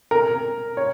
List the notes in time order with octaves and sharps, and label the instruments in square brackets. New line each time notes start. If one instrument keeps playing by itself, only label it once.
[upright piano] A#4
C#5